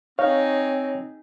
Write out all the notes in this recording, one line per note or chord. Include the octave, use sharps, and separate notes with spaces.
C4 D#4 G#4 C#5 F5